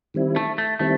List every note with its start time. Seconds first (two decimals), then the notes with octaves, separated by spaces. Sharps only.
0.14 D#3 G3 C4 E4
0.36 A3
0.58 A3
0.79 D#3 G3 A3 C4 E4